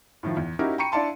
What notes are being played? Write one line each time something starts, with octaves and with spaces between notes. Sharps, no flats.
A2 D#3 F3
E2
C#4 D#4 E4 F#4 G4 A#4
G5 A#5 B5 C#6 C#7 D#7
D4 E4 D5 F5 A5 C6